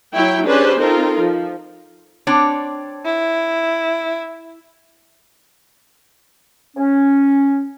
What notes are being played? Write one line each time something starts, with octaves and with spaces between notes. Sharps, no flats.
F#3 E4 C#5 G5
C#4 D4 G4 G#4 B4 C5
C4 D#4 F4 A4 A#4
F3
C4 D4 C#5
E4
C#4